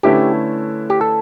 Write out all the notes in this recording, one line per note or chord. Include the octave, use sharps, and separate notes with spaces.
D3 A3 C#4 E4 G4 B4
G4
A4